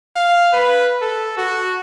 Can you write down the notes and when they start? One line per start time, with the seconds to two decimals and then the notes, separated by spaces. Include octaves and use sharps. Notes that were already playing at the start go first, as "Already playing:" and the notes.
0.16 F5
0.53 B4
1.02 A4
1.37 F#4